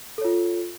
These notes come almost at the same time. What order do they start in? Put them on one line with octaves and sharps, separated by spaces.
A4 C#5 F4